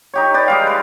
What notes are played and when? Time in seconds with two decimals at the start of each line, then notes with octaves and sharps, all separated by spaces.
0.14 D#4 G4 C#5
0.34 G4 B4 D5
0.48 G3 G#3 F5
0.67 B4